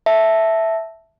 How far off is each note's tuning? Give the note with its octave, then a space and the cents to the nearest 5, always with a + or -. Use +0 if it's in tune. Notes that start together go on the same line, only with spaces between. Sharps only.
E5 +0 A5 +0